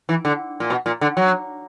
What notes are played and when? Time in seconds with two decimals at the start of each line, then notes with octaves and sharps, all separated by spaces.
0.09 E3
0.25 D3
0.60 A#2
0.70 B2
0.86 A#2
1.01 D3
1.17 F#3